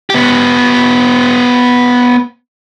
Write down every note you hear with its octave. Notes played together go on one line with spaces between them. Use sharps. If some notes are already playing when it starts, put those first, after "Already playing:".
B3 G4